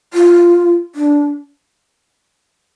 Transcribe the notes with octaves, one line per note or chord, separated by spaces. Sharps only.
F4
D4